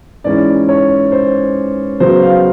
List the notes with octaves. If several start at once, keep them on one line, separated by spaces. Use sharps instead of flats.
G#2 E3 G#3 C#4 E4 D5
C#5
C5
C#3 F#3 B3 C5
F5